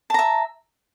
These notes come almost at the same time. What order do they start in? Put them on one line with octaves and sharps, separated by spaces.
A5 A#5 E5